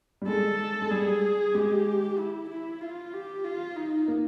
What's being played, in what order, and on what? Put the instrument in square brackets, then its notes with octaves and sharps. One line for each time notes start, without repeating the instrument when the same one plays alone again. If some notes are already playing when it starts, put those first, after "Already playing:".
[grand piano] G3
[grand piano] G#3 [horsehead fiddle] A4
[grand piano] G#3
[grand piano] G3 [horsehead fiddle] G#4
[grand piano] G#3 [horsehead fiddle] G4
[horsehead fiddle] E4
E4
F4
G4
F4
D#4
[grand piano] A#3